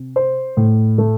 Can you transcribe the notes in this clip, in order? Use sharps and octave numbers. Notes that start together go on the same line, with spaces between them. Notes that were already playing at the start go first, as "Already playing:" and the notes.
Already playing: C3
C5
A2
A3